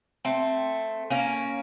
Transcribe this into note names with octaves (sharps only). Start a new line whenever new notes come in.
A3 C4
A#3 C#4